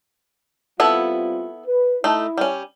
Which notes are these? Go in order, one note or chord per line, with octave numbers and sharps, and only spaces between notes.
G3 B3 C4 E4 F4 A4
B4
A3 D#4 E4
G3 C#4